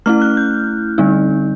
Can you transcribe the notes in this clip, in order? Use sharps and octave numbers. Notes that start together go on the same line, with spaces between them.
A3 C#4 E4 F6
F#6
G6
D3 G3 C4 D#4